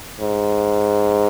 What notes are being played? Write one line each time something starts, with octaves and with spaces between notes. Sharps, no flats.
G#2